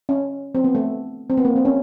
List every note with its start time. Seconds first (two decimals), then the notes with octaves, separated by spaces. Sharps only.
0.09 C#4
0.55 C4
0.64 B3
0.75 A3
1.30 C4
1.38 B3
1.45 A#3
1.56 C4
1.65 C#4